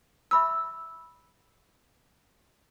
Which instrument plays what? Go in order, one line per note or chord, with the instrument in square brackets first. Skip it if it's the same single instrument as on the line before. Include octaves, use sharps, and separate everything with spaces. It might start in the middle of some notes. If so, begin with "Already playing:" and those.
[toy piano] E5 B5 D6 [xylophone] E6